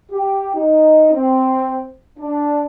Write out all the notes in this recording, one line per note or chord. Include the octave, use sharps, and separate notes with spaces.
G4
D#4
C4
D4